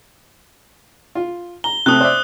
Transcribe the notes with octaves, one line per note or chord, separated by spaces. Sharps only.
F4
A#5 G7
C3 A3 C4 D#6 F#6
C5 D5 E5